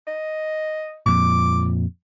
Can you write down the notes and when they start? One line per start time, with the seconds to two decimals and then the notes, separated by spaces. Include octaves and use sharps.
0.07 D#5
1.06 F2 A#2 D6